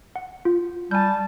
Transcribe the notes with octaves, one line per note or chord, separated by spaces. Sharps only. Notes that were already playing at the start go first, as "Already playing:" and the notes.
F#5
F4
G3 G#5 A5 G6